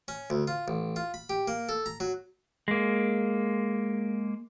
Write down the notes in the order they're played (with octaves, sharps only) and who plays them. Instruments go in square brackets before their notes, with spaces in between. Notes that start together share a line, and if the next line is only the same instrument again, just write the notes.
[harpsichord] C#4
D2
F4
A1
F4
B5
G4
A#3
A4
A#5
F#3
[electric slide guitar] G#3 A#3